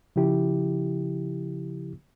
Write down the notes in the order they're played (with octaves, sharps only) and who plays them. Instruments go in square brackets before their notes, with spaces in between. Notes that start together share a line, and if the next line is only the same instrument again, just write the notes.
[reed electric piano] C#3 F3 E4 G4